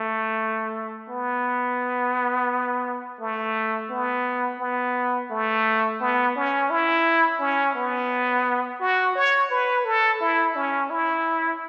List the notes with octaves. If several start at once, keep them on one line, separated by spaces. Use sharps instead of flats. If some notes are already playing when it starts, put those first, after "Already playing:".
Already playing: A3
B3
A3
B3
B3
A3
B3
C#4
E4
C#4
B3
F#4
C#5
B4
A4
E4
C#4
E4